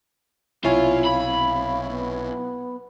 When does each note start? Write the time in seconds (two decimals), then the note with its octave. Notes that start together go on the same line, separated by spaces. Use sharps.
0.64 B1 C3 E4 F4 C#5 G#5
1.05 F5 B5
1.90 B3